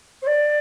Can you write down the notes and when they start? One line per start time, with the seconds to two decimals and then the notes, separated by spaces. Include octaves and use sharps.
0.22 C5
0.27 D5